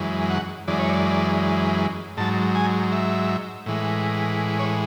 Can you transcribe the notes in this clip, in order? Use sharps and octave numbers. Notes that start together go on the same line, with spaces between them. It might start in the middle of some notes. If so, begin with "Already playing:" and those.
Already playing: F#2 E3 G#3
F#5
F#2 E3 G#3 D5
C#5
D5
G#2 F#3 A5
G#5
E5
A2 E3 G#3
C#5